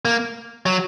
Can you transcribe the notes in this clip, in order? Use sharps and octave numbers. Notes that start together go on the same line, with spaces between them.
A#3
F#3